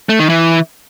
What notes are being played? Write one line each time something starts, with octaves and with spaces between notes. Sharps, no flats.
A3
D#3
E3